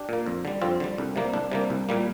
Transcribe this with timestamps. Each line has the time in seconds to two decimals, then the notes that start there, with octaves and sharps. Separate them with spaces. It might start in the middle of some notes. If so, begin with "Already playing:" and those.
Already playing: D4 G4
0.09 A#2 A#3
0.26 F2
0.45 D3 G3
0.62 F2 C4 F4
0.80 D3 G3
0.98 C2
1.16 C3 G3 A#3
1.34 C2 D4
1.52 C3 G3 A#3
1.70 C2
1.89 A#2 G3 A#3